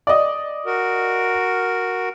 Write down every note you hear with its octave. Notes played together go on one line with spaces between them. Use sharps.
D5 D#5
F#4 A#4